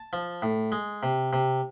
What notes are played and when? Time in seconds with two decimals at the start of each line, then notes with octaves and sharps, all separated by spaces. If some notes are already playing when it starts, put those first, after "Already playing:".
Already playing: A5
0.13 F3
0.42 A2
0.72 G#3
1.03 C3
1.33 C3